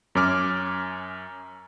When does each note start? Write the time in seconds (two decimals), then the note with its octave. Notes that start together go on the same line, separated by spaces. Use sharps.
0.15 F#2 C#4 D6 F6